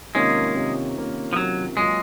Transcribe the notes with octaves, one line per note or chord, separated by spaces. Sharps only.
C3 D#3 G#3 A#3 C#4 F4
C3 D#3 A#3 C#4 F4
C3 D#3 A#3 C#4 F4
F3
C3 D#3 F#3 A#3 C#4 F4
F#3 G#3 A#3 F4